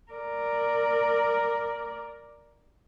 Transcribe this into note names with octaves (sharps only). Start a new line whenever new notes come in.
A#4 D5